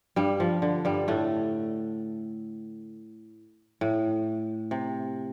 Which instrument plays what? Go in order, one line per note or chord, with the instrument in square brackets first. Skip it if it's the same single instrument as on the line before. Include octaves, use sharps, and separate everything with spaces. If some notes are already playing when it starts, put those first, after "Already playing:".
[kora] G2 G3
F3
D3
G2 G3
A2 A3
A2
C3